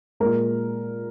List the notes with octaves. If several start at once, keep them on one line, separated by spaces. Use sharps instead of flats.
A#2 G#3 A#4